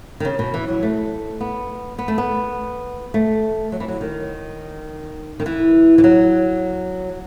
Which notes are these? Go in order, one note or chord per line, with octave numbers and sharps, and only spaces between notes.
D#3
C#3
B2
E3
F#3
A3
B3
B3
A3
B3
A3
F#3
E3
F#3
D#3
D#3
E3
E3
F#3